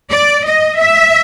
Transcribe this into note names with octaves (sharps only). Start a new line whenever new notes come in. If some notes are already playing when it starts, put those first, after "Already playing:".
D5
D#5
E5